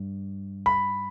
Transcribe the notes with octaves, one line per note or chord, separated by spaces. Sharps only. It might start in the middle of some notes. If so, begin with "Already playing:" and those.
Already playing: G2
B5